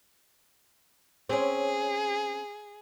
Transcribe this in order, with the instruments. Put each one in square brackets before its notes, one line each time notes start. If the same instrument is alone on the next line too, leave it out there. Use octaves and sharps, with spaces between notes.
[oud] C4 C#4 [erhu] G#4